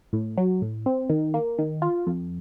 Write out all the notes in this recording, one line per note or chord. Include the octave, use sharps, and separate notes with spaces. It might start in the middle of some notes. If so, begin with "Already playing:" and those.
A2
F#3
A2
C4
D#3
A#3
D#3
F4
F2